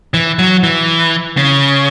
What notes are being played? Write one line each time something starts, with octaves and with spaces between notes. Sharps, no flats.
E3
F#3
E3
C#3